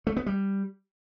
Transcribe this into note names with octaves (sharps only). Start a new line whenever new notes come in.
A3
B3
G3